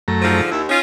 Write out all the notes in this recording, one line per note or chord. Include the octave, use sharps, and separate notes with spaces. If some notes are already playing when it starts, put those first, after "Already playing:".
F#2 A3 A#5
G#2 D3 F3
D#2 E4
C#4 D#4 F4